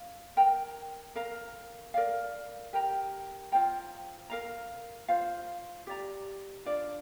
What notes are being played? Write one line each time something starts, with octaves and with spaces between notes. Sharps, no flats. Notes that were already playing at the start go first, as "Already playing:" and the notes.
Already playing: F5
A#4 G5 A#5
A#4 F5 A#5
A#4 D5 F5
G4 A#4 G5 A#5
F4 C5 G5 A#5
A#4 F5 A#5
F4 C5 F5
G4 D5 A#5
D4 F4 D5